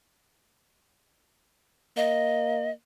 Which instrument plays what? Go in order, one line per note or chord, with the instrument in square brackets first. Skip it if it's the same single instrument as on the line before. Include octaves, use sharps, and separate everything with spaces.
[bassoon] A#3 [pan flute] D#5